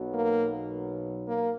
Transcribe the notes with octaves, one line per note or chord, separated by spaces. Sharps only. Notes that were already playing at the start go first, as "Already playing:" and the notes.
Already playing: B1 B2 F#3
A#3
A#3